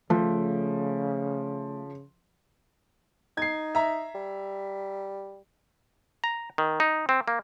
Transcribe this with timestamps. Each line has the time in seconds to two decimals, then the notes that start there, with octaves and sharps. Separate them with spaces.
0.10 C#3 F3 A3
3.37 D#4 G#6 C7
3.75 E5 A#5
4.15 G3
6.24 A#5
6.58 D#3
6.80 D#4
7.09 C4
7.28 A#3